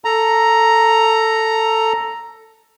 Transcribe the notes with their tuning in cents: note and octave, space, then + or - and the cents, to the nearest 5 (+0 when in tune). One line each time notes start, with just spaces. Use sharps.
A4 +10 A#5 +0